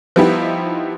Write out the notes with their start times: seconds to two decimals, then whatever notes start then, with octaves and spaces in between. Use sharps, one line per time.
0.16 F3 G3 B3 D#4 E4 G4